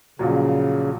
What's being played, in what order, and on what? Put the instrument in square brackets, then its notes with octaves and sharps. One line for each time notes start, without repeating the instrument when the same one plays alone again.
[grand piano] A#1 A#2 F#3 [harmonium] C#3